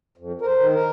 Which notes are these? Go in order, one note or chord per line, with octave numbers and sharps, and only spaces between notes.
F2
A#4
C5
D#3
A#4